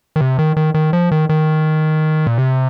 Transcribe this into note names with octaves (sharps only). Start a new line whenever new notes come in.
D#3
C3
D#3
D#3
D#3
F3
D#3
D#3
A#2
C3